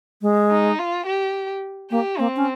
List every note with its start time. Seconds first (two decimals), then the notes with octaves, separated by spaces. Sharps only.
0.22 G#3
0.51 D#4
0.78 F4
1.06 G4
1.90 A#3 G4
2.19 A#3 C4
2.36 C#4